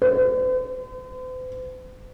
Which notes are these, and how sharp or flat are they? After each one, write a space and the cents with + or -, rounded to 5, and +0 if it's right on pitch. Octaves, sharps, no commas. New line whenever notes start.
C5 -45